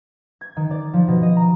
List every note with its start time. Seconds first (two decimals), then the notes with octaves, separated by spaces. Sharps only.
0.41 G#6
0.57 D#3
0.71 D5
0.94 F3
1.08 B2
1.23 D#5
1.37 A#5